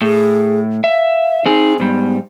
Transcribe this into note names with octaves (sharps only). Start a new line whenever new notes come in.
A2 G#4
E5 F5
C4 D#4 G#4
G#2 G3 B3